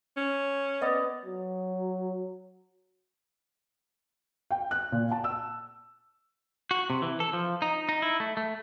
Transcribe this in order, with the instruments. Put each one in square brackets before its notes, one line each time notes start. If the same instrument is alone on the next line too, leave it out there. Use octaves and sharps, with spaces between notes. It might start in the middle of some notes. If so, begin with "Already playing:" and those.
[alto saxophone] C#4
[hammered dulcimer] B3 D5 D#5
[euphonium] F#3
[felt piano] G5
F#6
A#2
A5
E6
[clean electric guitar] F#4
C3
E3
A4
F3
D#4
D#4
E4
A3
A3